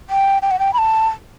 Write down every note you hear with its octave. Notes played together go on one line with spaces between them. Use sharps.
G5
G5
F#5
G5
B5
A5